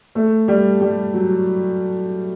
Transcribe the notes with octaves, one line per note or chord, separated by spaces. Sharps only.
A3
G3
G3
F#3